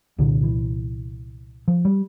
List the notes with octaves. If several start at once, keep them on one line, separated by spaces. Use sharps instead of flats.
C2 A#2 D3
E3
F3
G3